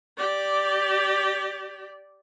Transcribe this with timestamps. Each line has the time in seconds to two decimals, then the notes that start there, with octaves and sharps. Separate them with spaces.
0.17 G4 D5